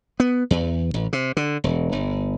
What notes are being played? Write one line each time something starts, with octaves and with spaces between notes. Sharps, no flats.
B3
E2
A1
C3
D3
E1
G1